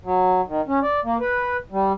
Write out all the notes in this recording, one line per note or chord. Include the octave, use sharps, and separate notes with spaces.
F#3
D#3
C#4
D5
A#3
B4
G3